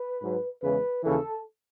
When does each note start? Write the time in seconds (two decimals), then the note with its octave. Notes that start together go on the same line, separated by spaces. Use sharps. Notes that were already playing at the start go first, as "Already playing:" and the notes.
Already playing: B4
0.22 G#2 F#3
0.63 E2 C#3 E3 G#3 B4
1.03 D#2 C#3 E3 A4